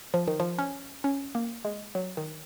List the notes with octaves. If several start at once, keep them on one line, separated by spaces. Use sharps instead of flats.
F3
D#3
F3
C#4
C#4
A#3
G#3
F#3
D#3